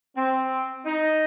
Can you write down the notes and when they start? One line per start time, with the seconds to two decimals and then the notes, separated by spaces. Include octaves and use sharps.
0.16 C4
0.85 D#4